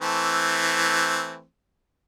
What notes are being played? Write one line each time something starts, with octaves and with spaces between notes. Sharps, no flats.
E3 A3 C4